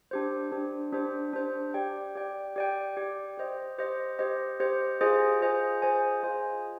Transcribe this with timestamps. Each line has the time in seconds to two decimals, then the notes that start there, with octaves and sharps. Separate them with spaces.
0.11 D4 G4 C5
0.52 D4 G4 C5
0.93 D4 G4 C5
1.33 D4 G4 C5
1.74 G4 D5 G5
2.15 G4 D5 G5
2.56 G4 D5 G5
2.97 G4 D5 G5
3.38 G4 C5 D#5
3.78 G4 C5 D#5
4.19 G4 C5 D#5
4.60 G4 C5 D#5
5.01 F4 G#4 C5 D#5 G#5
5.41 F4 G#4 C5 D#5 G#5
5.82 F4 G#4 C5 D#5 G#5
6.23 F4 G#4 C5 D#5 G#5